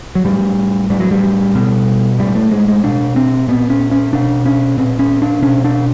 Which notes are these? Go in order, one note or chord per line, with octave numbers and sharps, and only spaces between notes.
F#3
A2 G3
A2 G3
F#3
G3
B2
A2 G3
A3
G#3
G#3
B2 D4
C4
A#2 B3
C#4
C#4
B2 D4
C#4
A#2 C4
C#4
D4
B2 C#4
D4